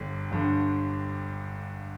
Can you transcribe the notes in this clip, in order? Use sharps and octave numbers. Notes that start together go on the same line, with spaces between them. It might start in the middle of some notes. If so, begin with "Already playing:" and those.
Already playing: G1 G2 D3
G1 G2 D3